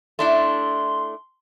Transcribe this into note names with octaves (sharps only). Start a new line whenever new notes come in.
A3 D4 E4 C6